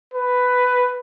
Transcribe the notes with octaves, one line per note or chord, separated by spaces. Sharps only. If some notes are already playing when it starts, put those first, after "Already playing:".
B4